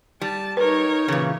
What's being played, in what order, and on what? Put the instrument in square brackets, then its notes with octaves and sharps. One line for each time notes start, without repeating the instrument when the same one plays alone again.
[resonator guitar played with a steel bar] G3 [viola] A5
[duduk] D#4 [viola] A#4 C#5 [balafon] B4
[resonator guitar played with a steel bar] A#2 C#3 [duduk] E3